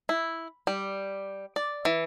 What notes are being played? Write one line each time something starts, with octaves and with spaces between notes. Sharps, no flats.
E4
G3
D5
E3